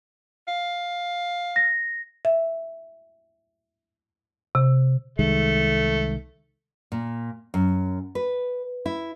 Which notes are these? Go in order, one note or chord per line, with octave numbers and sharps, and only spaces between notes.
F5
A#6
E5
C3
C2 D#3 G#3 A3
A#2
F#2
B4
E4